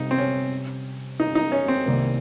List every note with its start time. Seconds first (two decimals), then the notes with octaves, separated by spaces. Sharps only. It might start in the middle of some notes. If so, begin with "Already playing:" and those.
Already playing: C3 G3 D#4
0.11 C4
0.18 C#4
1.20 D#4
1.35 D#4
1.52 C#4
1.68 C4
1.86 C2 C3 D#3 A#3